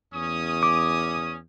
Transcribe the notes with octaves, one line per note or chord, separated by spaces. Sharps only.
E2 C#4 D#6
D6